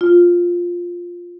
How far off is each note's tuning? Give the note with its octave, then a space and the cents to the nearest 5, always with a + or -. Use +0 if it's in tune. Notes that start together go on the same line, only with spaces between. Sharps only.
F4 +5